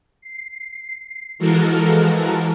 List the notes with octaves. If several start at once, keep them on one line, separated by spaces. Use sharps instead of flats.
C7
E3 F3 G#3 F#4 A4 A#4